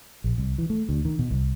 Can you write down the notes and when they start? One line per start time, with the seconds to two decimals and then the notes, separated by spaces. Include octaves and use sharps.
0.24 A#1
0.38 C2
0.58 E3
0.70 A3
0.89 D2
1.05 D#3
1.19 B2
1.31 C2